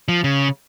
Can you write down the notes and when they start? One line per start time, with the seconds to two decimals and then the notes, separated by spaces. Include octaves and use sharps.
0.08 F3
0.24 C#3